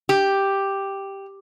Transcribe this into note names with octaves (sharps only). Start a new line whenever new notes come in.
G4